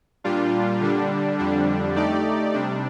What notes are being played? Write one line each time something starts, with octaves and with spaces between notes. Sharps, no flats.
A#2 G3 D4 F4
D3 G3 D4
F2 D3 G3 D4
A3 D#4 G4 D5
C3 G3 D4